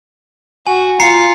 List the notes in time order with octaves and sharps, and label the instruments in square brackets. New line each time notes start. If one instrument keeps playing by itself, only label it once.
[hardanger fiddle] F#4 [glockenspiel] G#5
[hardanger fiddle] F4 [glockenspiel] A#5 C7 C#7